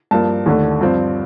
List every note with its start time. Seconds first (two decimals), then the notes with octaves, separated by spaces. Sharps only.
0.11 G2 F3 A#3 A5
0.46 D#2 D3 A3
0.81 G2 F3 C4